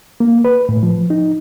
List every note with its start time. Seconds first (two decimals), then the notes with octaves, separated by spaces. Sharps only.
0.20 A#3
0.45 B4
0.69 A2
0.83 F3
1.10 D#4